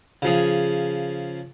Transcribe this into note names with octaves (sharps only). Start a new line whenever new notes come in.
C#3 F3 G#4